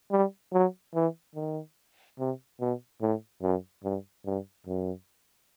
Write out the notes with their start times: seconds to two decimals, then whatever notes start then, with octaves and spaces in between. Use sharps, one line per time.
0.11 G3
0.53 F#3
0.95 E3
1.35 D#3
2.19 C3
2.60 B2
3.01 A2
3.42 F#2
3.84 G2
4.25 G2
4.67 F#2